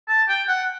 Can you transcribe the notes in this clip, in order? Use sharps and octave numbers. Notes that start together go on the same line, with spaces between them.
A5
G5
F#5